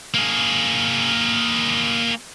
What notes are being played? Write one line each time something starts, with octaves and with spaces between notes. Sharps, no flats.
A#3 G#4